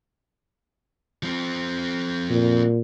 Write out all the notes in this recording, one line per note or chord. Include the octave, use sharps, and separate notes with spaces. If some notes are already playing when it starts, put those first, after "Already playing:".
F3 C4
A#2